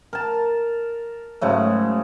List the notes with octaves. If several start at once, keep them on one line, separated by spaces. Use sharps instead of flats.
A#4 A5
G#2 C#3 F#3 A3